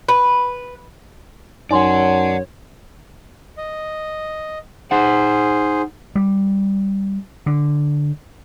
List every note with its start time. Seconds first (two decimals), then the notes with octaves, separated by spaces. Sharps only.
0.09 B4
1.71 F#2 D#4 C#5 D5 F#5 G#5 C6
3.58 D#5
4.91 D#4 G#4 C5 F#5
6.15 G3
7.46 D3